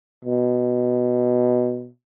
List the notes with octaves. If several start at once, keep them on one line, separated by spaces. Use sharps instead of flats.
B2